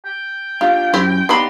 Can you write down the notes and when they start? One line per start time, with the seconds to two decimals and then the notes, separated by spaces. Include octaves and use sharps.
0.05 G5
0.61 D4 F4 G4 F5
0.94 F#2 C4 E4 G4
1.29 B3 D4 D#4 G4 B5 C6